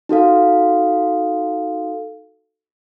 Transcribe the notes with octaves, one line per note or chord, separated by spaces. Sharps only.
D#4 F#4 A4 F5